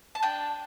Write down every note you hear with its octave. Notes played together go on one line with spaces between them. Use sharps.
A5
D4 G5